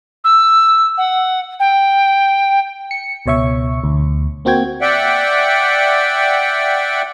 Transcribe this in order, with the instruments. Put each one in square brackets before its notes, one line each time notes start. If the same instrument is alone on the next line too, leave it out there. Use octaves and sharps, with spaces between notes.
[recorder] E6
F#5
G5
[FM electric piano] C#7
C#2 B2 C#5 E5 C#6
D2
A#3 C4 F#4 G5 G#6
[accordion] D5 E5 F#5 G5